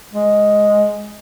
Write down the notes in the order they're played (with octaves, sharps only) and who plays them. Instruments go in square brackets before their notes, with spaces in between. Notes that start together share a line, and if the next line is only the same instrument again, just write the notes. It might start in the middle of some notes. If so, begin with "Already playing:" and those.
[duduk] G#3